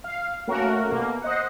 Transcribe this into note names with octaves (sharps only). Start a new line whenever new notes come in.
F5
A3 A#3 C#4 F#4 A#4
B2 A#3
C5 D#5 F#5